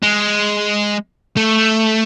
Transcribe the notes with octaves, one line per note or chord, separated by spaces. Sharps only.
G#3
A3